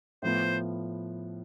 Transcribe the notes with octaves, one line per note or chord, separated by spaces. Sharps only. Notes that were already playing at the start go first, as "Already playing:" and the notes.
A2 F3 B3 C5